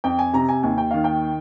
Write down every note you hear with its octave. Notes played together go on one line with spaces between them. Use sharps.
F2 G5
G#5
C3 A#5
G#5
D#2 G#5
G5
D#3 F5
G5